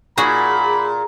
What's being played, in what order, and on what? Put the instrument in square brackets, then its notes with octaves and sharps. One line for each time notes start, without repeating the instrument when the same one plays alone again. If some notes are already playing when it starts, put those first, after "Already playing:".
[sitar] A#2 [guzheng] F#4 G#4 [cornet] B5